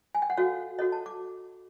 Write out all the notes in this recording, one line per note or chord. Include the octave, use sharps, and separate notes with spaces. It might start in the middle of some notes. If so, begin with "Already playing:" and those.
G#5
G5
F#5
F#4 A4 C#5 F5
F#4 A4 C#5 D#5
A5
D6